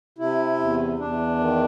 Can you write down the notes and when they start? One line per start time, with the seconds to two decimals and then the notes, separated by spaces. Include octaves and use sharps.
0.18 C3 E4
0.59 E2
0.99 E2 D4
1.39 D#3